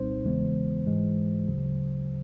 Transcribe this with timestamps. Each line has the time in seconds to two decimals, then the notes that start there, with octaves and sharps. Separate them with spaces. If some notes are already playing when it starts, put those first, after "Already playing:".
Already playing: C2 A#2 G3 C4 D#4 C5
0.24 E2 C#3 E3 G#3 B3
0.86 G#2 E3 G#3
1.47 D2 C#3 F#3